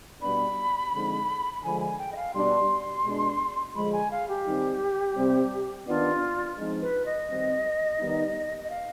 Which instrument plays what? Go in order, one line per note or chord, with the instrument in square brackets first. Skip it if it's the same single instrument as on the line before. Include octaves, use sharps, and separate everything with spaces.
[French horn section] B2 G3 B3 D4 [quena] B5
[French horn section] D3 F3 G#3 C4 D#4
[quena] B5
[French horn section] D3 F3 G#3 [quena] G#5
[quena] G#5
G5
D#5
F5
[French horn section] B2 G3 D4 [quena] C6
[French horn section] B2 G#3 D4
[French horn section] D3 F3 G#3 [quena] B5
[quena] G#5
F5
G4
[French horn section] D#3 G3 C4 D#4
C3 G3 C4
[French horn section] D#3 B3 D4 [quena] F4
[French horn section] F3 G#3 C4 D#4
[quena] B4
D#5
[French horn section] D#3 G3 C4
D#3 G3 B3 D#4
[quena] D#5
F5